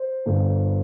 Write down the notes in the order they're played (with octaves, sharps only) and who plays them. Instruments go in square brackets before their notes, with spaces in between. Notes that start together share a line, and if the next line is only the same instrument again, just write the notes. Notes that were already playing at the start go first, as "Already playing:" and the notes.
Already playing: [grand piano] C5
G1